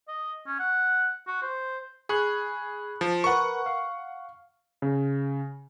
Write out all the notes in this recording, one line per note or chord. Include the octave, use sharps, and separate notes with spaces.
D#5
C#4
F#5
F#4
C5
G#4 B5 C#6 F#6
F3
A#4 B4 F#5 C#6
F5
C#3